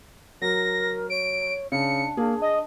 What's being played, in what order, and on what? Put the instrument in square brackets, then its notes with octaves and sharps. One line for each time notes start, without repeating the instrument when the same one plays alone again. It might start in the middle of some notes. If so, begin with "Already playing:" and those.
[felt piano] F#3 [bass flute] A#4 [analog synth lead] A#6
[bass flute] C#5 [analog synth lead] D7
[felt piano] C#3 [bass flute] D4 [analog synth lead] C#7
[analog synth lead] A#3 [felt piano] G#4
[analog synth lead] D#5